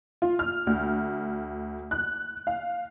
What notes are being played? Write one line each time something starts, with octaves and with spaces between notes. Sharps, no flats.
F4
F6
D2
F#6
F5